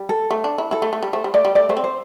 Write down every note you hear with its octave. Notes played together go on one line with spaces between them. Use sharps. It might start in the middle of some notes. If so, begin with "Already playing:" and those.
Already playing: G3
A4
A3
D4
E4
E4 A4
A3
A3
G3
A3 C5
G3
A3 D5
G3
A3 D5
A3 C5
C4
C5